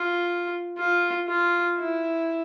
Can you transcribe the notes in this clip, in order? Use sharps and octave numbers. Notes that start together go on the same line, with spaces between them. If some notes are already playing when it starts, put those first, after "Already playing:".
Already playing: F4
F4
F4
E4